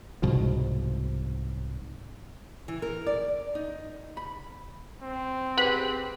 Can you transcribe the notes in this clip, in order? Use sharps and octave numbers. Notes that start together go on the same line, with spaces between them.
C2 G#2 B2 F3
E3
A#4
D5
D#4
B5
C4
G4 G#4 B4 F#5 B5 F#6